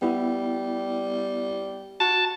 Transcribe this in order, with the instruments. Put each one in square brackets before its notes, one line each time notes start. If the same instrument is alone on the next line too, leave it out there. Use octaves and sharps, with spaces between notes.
[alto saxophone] G3 [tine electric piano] B3 E4
[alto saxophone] F#4 [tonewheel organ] A5